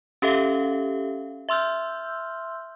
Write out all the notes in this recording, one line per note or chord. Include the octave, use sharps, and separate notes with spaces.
C#4 G4 A4 E5 F5
E5 C6 E6 F6 G6